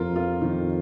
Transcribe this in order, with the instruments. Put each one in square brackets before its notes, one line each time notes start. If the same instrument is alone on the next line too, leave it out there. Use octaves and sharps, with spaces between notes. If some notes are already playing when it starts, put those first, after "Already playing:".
Already playing: [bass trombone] F2 [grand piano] F4 A#4
[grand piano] F4
D#3